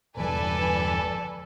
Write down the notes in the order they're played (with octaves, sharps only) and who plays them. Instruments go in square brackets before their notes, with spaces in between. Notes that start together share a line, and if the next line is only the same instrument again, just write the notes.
[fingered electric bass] G1 E2 F3 [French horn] A4 [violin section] B4 D5 G#5